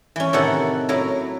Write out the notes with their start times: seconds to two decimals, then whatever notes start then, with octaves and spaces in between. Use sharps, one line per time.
0.16 E3 C#4
0.33 A2 C3 D#3 E4 A4 F#5
0.89 A2 F#3 E4 A#5